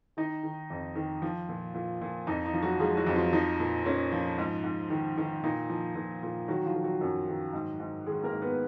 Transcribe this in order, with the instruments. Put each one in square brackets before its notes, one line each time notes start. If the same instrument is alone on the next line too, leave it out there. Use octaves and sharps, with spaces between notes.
[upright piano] D#3 D#4 D#5
D#3
F2
D#3
F3 F4
A#2
A#2
A#2
F2 D#4
D#4
F3
F#3 F#4
F3 G#3 G#4
F#3 F#4
F2
F3 F4
F3 D#4
A#2
A#2 C#4
F3
G#2
G#2
D#3
D#3
A#2 D#4
F3
A#2
A#2
D#3 F#3 F#4
F3 F4
D#3
F#3 F#4
F#2
D#3
G#2
G#2
D#3 G#3 G#4
A#3 A#4
G#2
B3 B4